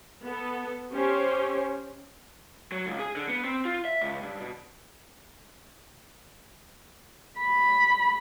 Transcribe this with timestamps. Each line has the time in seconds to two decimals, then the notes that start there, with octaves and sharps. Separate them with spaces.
0.24 B3 A4
0.93 C#4 G4 C5 C#5
2.72 F#3
2.86 C#2
2.99 G#4
3.16 D3
3.29 B3
3.44 C4
3.65 F4
3.85 E5
4.02 C#2
4.23 G2
4.40 B2
7.41 B5